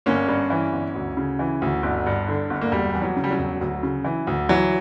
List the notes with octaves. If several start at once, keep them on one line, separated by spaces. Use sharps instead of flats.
G1 A#3 C#4
G2
E3
G1
D2
C#3
E3
D2
G1
G2
D3
G1
A#3
E1 G3
E2
F#3
C#3
G3
F#3
E1
D2
C#3
E3
D2
E3 F#3